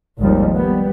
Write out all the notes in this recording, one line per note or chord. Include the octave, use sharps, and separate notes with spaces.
G#1 D#2 D#3 F3 G3
G3 B3